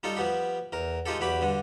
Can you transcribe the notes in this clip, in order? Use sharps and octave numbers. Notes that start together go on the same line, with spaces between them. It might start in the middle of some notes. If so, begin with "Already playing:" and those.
G3 D#4 F4 A4
F3 G3 B3 G4
E2 A#4
G#3 D#4 F4 G4 A4
E2 F#3 G4 B5 D6
G2 D3 D4